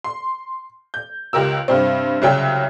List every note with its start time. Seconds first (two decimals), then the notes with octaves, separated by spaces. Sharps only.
0.04 C6
0.94 G6
1.33 C#2 G4 A#4 E6
1.68 G2 C3 C4
2.22 C2 C#3 F#3 G5